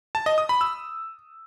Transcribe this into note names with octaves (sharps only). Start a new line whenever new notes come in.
A5
D#5
D#6
B5
E6